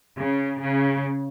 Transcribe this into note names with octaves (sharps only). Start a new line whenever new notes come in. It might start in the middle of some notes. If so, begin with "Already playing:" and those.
C#3
C#3